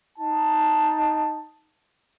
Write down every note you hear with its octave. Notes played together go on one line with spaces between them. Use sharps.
D#4 A5